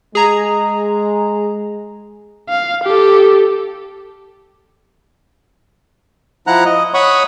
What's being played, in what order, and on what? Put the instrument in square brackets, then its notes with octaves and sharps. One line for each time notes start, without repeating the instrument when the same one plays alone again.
[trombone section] G#3 [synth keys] G#4 A#5
[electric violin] F5
G4 A4
[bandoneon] F3 E4 F#5 A#5 F#6
D#5
C#5 F#5 B5 C#6 D#6